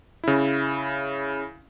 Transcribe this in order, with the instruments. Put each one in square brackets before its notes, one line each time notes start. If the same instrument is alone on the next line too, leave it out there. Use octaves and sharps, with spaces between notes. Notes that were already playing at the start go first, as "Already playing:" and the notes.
[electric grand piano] C#3 E4